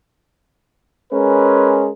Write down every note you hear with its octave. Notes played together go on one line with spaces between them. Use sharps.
G#3 C#4 A#4 B4